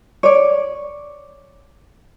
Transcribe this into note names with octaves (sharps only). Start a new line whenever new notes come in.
C#5 D5